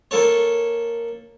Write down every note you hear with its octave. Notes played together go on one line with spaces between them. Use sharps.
A#3 A4 C#5